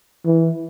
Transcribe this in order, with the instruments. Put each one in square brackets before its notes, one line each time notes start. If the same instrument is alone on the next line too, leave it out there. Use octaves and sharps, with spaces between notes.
[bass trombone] E3